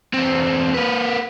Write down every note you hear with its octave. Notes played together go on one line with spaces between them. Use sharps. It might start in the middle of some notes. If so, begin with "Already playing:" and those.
E2 C4
A#3 B4